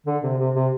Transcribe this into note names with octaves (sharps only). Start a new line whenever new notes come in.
D3
C3
C3
C3